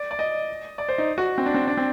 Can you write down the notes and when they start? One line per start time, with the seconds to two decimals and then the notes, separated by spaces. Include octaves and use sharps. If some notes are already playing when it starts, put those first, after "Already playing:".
Already playing: D5
0.11 D5
0.19 D#5
0.78 D5
0.89 C5
0.98 D#4
1.18 F#4
1.38 C4
1.46 D4
1.54 C4
1.67 D4
1.77 C4